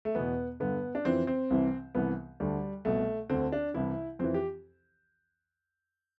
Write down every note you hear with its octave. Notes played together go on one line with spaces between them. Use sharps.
A3
E2 B2 B3
G2 D3 B3
D4
F2 E3 C4
C4
C2 C3 E3
C2 C3 E3 B3
D2 D3 G3
C2 B2 A3
D2 D3 C4
D4
C2 C3 E3 E4
F2 E3 C4
G4